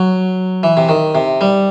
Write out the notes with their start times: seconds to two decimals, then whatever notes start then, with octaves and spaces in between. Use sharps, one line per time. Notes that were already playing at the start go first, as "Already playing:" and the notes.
Already playing: F#3
0.63 E3
0.77 C3
0.89 D#3
1.15 C3
1.41 G3